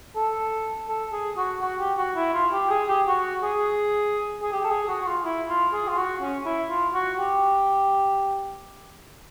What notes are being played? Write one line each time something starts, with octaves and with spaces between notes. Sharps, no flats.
A4
A4
G#4
F#4
F#4
G4
F#4
E4
F4
G4
G#4
G4
F#4
G#4
G#4
G4
A4
G#4
F#4
F#4
F4
E4
F4
G#4
F4
F#4
C#4
E4
F4
F#4
G4